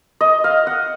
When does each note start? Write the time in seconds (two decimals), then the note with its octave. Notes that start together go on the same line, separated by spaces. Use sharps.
0.21 D#5
0.44 F5
0.67 F#5